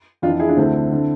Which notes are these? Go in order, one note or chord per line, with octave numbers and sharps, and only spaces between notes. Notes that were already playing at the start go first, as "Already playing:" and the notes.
F2 E3 D4 F4
E4 G#4
D4 F4
D2 D3 C4 E4
D3